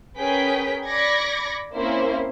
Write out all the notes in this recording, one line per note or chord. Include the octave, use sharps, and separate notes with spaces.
C#4 G#4 A#4 B4 G5 B6
D5 B5 D6 G#6 A#6 C#7
A#3 C4 C#4 E4 C5